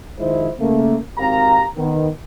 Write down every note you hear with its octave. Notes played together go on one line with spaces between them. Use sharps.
D#3 F3 G#3 E4 C5
C#3 A3 A#3
G#1 C4 G4 A#4 F5 A#5
D#3 B3